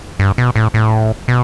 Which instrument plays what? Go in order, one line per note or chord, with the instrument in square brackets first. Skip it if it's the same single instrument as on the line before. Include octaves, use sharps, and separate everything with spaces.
[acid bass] G2
B2
A2
A2
B2